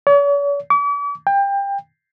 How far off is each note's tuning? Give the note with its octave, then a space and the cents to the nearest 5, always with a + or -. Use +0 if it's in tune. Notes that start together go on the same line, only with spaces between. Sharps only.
C#5 +45
D6 -45
G5 +25